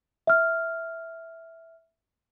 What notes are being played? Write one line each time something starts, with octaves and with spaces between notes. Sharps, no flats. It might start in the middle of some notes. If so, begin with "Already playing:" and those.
E5 F6